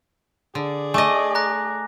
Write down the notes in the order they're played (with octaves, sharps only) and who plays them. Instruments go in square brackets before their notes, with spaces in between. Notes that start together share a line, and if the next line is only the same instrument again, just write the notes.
[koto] D3 [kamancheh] G#4 D5
[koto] A3 D#5 [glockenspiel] G#5 D6 A#6
[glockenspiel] A#5 F#6 A#6